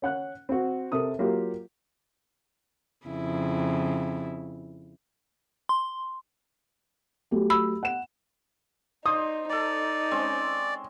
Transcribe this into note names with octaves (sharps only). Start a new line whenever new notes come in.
C#4 F#5 F#6
C4 F#4
C3 A4 A#4 D#6
F#3 A#3 F4 G4
F2 C#3 E4
C6
F#3 A3 G4
B5 E6
F#5 E7
D#4 C5 D5 D#6
D#4 A4 D5 A#5
G#3 C4 C#4